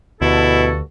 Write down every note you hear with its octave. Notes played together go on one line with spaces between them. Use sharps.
D2 G2 B2 E4 F#4 A4